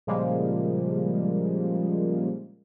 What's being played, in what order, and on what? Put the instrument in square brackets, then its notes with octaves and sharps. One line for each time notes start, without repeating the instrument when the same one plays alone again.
[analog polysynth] A#2 C#3 F3 G3 G#3 A#3